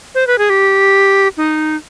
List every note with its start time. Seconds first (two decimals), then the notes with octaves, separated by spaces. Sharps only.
0.15 C5
0.27 B4
0.38 G#4
0.50 G4
1.37 D#4